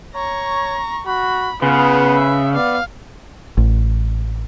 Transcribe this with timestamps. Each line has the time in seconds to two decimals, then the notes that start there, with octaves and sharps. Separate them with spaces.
0.15 C#5 A#5 C#6
1.06 F#4 B5
1.62 C#3 B3 F4 B4
2.15 E5
2.54 B3 D5 F5
3.57 A1